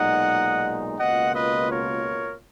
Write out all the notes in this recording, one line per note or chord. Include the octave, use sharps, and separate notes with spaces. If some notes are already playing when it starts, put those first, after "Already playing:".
Already playing: B1 A#2 G#3 D#4 D#5 F#5
C#2 B2 A#3 F4 D#5 F#5
B4 D#5
A#4 C#5